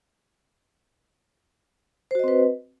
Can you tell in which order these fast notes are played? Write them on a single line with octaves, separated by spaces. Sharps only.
C5 F#4 D#5 C4 B4